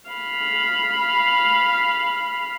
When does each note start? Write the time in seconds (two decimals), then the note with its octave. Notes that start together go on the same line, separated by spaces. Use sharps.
0.10 F5 B5